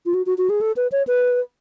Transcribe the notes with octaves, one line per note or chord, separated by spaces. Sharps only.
F4
F#4
F#4
F#4
G#4
A4
B4
C#5
B4